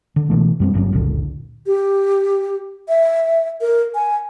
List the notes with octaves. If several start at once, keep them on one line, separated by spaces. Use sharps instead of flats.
D3
B2 E3 A3
F#2 G3 C4
G1 G2 F#3 C#4
F#1 C#2 A#2 D3
G4
E5
A#4
G#5